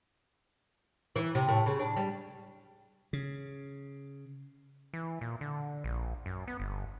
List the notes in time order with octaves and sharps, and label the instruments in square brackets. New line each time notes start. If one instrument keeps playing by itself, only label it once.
[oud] E3
C3
A2
C#3
D4
G3
[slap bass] C#3
[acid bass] E3
A#2
D3
A#1
F#2
B3
G1